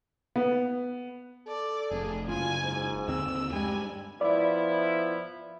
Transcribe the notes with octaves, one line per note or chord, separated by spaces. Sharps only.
B3
A4 D5
F1 G#4
F#1 F4 G#5
G#2
D#2 D3 C4 E6
G2 G3 G#3 G#5
F3 B3 E4 D5